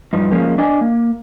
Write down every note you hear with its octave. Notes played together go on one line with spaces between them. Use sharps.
G2 F3 D#4
F3 G#3 A#3 C#4
D4 D#5 G#5
A#3